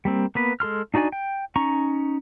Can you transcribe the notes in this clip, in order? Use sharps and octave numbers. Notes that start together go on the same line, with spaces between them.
G3 A#3 C4
A#3 B3 B4
G#3 A4 C6 F6
D4 D#4 F#4 D5 G#5
G5
C#4 D#4 A#5 C#6